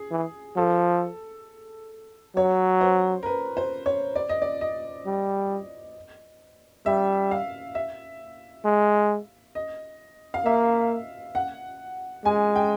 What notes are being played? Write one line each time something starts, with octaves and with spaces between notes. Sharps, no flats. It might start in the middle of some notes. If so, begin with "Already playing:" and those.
Already playing: G#4
E3
F3 A4
F#3 C#5
C5
A#4
B4
C5
C#5
D5
D#5
D5
D#5
G3
G3 E5
F5
E5
G#3
D#5
F5
A#3 E5
F#5
G#3 G#5
G5